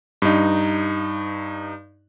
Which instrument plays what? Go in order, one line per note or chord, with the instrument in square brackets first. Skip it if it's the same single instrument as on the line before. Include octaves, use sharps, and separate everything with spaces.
[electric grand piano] G2 D#4